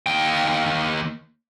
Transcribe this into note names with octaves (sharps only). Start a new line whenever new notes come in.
D#2 G5